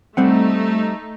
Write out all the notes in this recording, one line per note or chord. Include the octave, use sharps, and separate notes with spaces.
G3 A3 C4 D#4 F#5